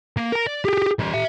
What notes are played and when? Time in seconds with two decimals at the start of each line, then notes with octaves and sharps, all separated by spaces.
0.17 A#3
0.32 A#4 A#5
0.47 D5
0.65 G4 G#4
0.99 G3 C#4
1.14 E5 A#5